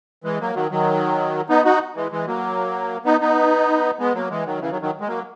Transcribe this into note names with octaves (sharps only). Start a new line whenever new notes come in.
E3 G#3
F#3 A#3
D#3 F#3
D#3 F#3
B3 D#4
D#4 F#4
E3 G#3
E3 G#3
F#3 A#3
B3 D#4
B3 D#4
G#3 B3
F#3 A#3
E3 G#3
D#3 F#3
C#3 E3
D#3 F#3
D#3 F#3
G#3
F#3 A#3